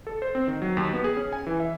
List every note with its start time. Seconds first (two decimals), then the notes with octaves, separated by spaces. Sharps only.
0.07 A4
0.22 C5
0.35 C4
0.48 D#3
0.62 F#3
0.77 D#2
0.93 B3
1.04 G#4
1.17 C#4
1.33 G#5
1.47 E3
1.60 E5